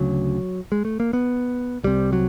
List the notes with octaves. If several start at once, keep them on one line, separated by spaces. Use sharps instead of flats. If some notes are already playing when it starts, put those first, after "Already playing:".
Already playing: D2 C#3 F#3
G#3
A3
A#3
B3
C2 C3 G3
F#3